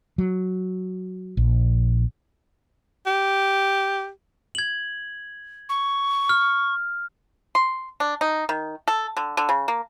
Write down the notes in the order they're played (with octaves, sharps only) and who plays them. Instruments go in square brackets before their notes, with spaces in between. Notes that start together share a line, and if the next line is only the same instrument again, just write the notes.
[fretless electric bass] F#3
A#1
[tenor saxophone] G4
[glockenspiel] G#6 F#7
[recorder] C#6
[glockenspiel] F6
[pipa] C6
D4
D#4
D#3
A4
D3
D3
C#3
A#3